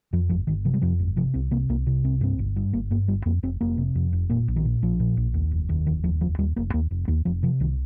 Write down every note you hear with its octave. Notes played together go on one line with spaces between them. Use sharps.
F2 F3
G1 F3
G1 D#3
C3 F3
G3
F2 F3
G1
C3 F3
C2 C4
C3 A#3
C2 A#3
C3
C2 C4
G2 C4
G1
G2
G1 A#3
G2 A#3
G1 G3
F2 A#3
F1 C4
F1 A#3
C3
F2
F1
A#2 A#3
A#1
D#3
A#2
A#1 F3
A#2
A#1
D#2
F1
D#2
F1 D#3
D#2 F3
F1 F3
D#2 G3
F1 A#3
D#2 A#3
F1
D#2 A#3
F1 F3
C3 F3
C2 D#3